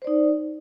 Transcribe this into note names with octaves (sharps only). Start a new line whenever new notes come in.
D#4 C5 D5